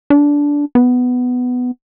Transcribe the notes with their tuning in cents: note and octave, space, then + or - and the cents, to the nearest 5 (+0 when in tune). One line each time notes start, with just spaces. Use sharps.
D4 -15
B3 +10